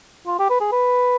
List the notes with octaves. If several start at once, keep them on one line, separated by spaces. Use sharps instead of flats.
F4
G4
B4
G#4
B4